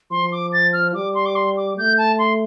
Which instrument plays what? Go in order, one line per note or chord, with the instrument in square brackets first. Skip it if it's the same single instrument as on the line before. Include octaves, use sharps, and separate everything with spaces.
[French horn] F3 [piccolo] C6
[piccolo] D6
A6
F6
[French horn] G3 [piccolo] D6
[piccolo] C6
D6
C6
D6
[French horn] A3 [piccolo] G6
[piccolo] A5
C6